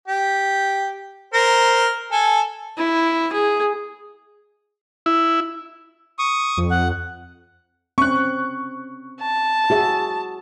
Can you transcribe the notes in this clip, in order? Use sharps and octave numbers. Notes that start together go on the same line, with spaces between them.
G4
A#4 C5 A#5
A4 G#5
E4
G#4
E4
C#6 D#6
F2
F#5
C4 C#4 C#6 F#6
A5
F#4 G#4 E5